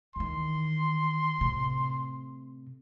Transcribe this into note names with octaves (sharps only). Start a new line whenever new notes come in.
E2 D#3 C6
A2 C3